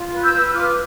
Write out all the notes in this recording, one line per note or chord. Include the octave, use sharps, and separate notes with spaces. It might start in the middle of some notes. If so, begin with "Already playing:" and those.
Already playing: F4
B4
E6 G6
B4
E6
F4 D6 F6